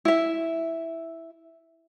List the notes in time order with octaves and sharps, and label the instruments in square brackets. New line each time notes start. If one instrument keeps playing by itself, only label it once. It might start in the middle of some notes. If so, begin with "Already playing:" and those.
[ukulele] E4 E5